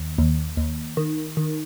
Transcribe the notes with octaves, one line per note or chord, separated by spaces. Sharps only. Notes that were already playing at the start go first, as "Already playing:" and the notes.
Already playing: D#2
D#2
D#2
D#3
D#3